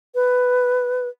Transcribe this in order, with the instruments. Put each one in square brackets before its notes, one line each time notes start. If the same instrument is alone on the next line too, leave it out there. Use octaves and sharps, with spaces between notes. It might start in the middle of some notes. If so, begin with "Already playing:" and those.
[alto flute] B4